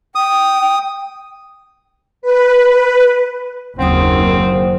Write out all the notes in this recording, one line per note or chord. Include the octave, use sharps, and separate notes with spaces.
G5 D#6
B4
F#1 D#2 D#3 F#3 C4 C5 D#6